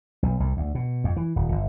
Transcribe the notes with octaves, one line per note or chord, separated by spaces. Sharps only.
B1
C2
D2
B2
F2
E3
D#1
G1